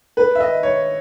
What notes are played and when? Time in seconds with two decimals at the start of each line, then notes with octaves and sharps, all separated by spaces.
0.17 B4
0.35 E5
0.40 D#5
0.63 C#5